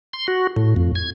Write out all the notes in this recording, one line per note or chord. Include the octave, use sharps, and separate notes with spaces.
C6
F#4
A2
F2
G#6